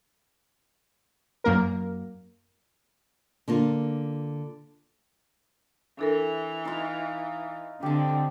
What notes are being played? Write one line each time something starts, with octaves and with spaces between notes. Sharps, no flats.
F#2 A#3 A#4
D3 A#3 F4
E3 D4 A4 A#4
D#4 F4
D3 C4 G4 A5